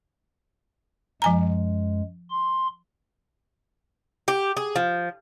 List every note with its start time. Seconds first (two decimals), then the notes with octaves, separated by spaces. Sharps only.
1.22 F#2 F3 G#3 G#5 A#5
2.31 C6
4.28 G4
4.57 G#4
4.76 F3